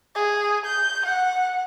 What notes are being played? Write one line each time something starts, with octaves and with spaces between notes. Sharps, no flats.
G#4
G6
F#5